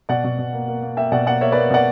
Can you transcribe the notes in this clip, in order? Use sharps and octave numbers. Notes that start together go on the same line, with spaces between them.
B2 D5 F#5
B2
B2
A#3
A#3
A#3
A#3 E5 G5
B2 D5 F#5
A#3 D5 F#5
A#3 C#5 E5
A#3 B4 D5
B2 D5 F#5